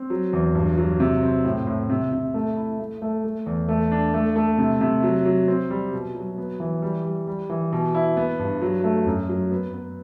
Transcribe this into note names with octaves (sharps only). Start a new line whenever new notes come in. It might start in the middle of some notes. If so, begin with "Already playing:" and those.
Already playing: C4
F#3
E2
G2
F#3
C3
C4
A2
A2
C3
C3
A3
E4
A3
A3
A3
E2
A3
D4
A3
A3
C3
C3
F#3
F#3
C4
G3
B2
F#3
B3
E3
G3
G3
G3
E3
B2
E4
B3
G2
F#3
A3
F#2
F#3
B3
B3